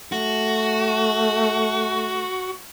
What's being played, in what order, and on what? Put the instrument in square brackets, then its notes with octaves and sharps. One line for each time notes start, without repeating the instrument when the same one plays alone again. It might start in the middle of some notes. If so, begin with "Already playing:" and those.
[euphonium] A3 [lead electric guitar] F#4